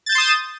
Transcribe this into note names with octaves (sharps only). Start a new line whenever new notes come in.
C6 D#6 G6 A6 E7